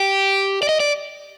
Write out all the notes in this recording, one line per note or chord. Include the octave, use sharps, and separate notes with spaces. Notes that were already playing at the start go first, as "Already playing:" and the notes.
Already playing: G4
D5
D#5
D5